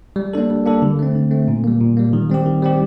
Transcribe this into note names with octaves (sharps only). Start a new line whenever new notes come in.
G3
A#3 D4 A4
G3
A#3 D4 A4
D3
A3 C4
D3
A3 C4
A#2
G3 A#3
A#2
G3 A#3
D#3
G3 C4 G4
D#3
G3 C4 G4